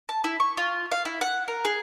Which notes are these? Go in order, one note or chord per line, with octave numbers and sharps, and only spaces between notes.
A5
E4
C#6
F4
F5
E4
F#5
A#4
G#4